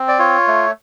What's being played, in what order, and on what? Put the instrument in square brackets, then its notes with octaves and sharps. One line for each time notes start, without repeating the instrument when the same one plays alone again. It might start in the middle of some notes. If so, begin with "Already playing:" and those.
Already playing: [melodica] C4
D5
F4 C#5
A3